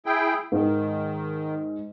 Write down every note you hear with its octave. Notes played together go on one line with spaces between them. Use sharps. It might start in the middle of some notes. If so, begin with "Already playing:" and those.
E4 G#4 G5
G#2 D#3